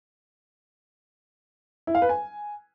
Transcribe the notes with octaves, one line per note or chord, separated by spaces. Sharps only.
E4
F5
B4
G#5